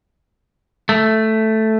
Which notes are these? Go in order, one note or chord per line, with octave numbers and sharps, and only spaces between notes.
A3